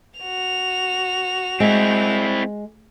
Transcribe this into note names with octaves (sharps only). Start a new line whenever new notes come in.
F#4 F7
G#3 C4 E4